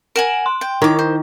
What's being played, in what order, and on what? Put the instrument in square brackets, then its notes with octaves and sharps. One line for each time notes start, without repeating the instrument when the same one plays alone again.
[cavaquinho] A#4 F#5 G#5 [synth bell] D7 E7 F#7
[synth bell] C6
[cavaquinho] G5
[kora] D#3 [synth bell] E4 [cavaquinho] C#5 D6
[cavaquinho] C5